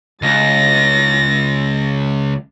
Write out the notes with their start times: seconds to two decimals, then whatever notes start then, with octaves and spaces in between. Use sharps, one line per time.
0.22 C#2 A6 A#6